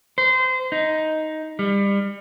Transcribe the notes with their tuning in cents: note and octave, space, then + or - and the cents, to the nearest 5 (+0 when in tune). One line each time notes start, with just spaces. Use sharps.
C5 -25
D#4 +5
G3 +30